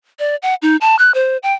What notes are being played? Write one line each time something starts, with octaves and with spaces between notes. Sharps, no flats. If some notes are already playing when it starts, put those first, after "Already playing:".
D5
F#5
D#4
A5
F#6
C5
G5